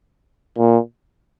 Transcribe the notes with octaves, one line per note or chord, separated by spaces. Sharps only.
A#2